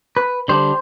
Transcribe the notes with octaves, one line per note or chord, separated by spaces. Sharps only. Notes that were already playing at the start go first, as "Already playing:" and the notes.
B4
D3 G3 D4 C5